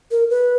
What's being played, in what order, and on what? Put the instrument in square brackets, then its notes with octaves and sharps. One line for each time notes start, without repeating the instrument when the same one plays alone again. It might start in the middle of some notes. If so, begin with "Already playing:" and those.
[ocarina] A#4
B4